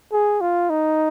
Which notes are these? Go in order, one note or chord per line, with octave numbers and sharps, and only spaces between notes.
G#4
F4
D#4